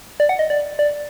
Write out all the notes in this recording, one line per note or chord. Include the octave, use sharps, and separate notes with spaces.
D5
F#5
D#5
D5
D5